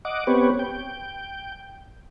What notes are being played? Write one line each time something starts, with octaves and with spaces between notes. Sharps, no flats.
D#5 F#5 D6
B3 C4 G4 B4 C#5
G5